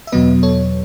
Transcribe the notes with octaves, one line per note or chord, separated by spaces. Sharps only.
E5
E2 B2 F#3 B3 B4 D#5
A4 C#5